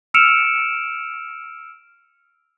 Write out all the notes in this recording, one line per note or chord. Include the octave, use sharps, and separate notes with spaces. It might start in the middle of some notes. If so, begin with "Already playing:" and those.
E6 F6 C#7 D7 E7 F7